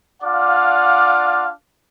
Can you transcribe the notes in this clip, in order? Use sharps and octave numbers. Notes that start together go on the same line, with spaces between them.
D4 F4 D5 F5 F#5 D6